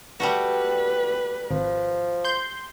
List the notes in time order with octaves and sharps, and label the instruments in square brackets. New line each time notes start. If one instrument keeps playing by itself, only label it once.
[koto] G3 A3 F#4 [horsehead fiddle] B4
[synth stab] G#1 [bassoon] F3
[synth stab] C6 G6